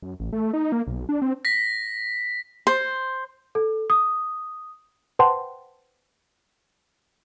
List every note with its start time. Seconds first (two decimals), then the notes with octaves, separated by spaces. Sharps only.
0.02 F#2
0.20 A1
0.33 A3
0.53 D#4
0.72 A#3
0.87 B1
1.09 D4
1.22 C4
1.45 A#6 B6
2.67 C5
3.55 A4
3.90 D#6
5.19 B4 C5 F#5 G5 A5 C6